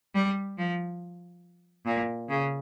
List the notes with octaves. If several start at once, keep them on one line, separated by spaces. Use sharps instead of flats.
G3
F3
A#2
C#3